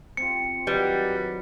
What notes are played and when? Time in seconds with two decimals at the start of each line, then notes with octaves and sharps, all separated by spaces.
0.17 C4 F4 C#7
0.67 D#3 F#3 G3 B4